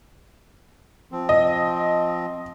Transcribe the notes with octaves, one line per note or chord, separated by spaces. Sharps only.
F3 C4
D#5